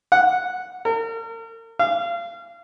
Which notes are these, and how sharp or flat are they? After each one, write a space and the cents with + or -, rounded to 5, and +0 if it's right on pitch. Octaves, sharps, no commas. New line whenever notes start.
F#5 -5
A#4 -40
F5 -30